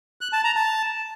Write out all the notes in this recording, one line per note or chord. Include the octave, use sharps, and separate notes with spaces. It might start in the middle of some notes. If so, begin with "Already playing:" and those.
F#6
A5
A#5
A5